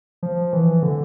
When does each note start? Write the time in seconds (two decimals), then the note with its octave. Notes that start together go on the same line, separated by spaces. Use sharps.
0.23 F3
0.53 E3
0.83 D3